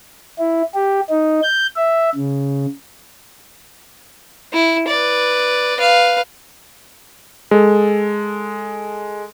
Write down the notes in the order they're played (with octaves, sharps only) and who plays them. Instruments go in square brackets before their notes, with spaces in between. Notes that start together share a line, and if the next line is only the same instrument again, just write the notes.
[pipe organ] E4
G4
D#4
G6
E5
C#3
[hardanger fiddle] E4
B4 D5
B4 F5
[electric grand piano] G#3 A4